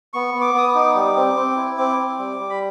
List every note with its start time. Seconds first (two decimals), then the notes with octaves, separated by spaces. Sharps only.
0.13 B3 C#6
0.34 B3
0.41 D6
0.54 B3 D#6
0.68 D6
0.75 D#4
0.95 G3 D6
1.16 C4
1.36 C4
1.57 E4
1.78 C4 D6
1.98 C4
2.19 G3
2.39 G3
2.50 B5